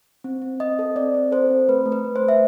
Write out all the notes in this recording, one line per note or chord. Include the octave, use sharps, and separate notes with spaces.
C4
C4
C4 D#5
A4
C4 D5
C4
A4 C5
C4
A3 B4
A3
B4
A3
C5
A3
E5